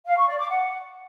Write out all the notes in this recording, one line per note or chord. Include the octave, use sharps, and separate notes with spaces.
F5
C#6
D5
D6
F#5